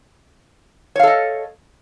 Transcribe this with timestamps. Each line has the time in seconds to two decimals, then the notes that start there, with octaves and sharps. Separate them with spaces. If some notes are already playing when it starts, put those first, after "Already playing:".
0.96 C#5
0.99 F5
1.03 A4
1.07 D#5